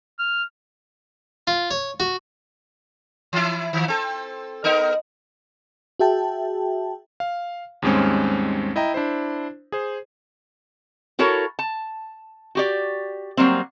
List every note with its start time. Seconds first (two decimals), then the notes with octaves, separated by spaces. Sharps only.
0.19 F6
1.47 F4
1.71 C#5
2.00 F#4
3.33 E3 E4
3.73 D#3 F3
3.88 C4 A4
4.64 B3 D#4 A#4 D#5
5.99 F#4 G#4 E5 G5 A5
7.20 F5
7.82 D#2 G#2 G3 G#3 C4 C#4
8.76 E4 D#5 G5 A#5
8.94 D4 E4 C5
9.72 G#4 C5
11.19 E4 F#4 A4 A#4 C#5
11.59 A5
12.55 F#4 G4 D5
13.37 F#3 G3 A#3 C4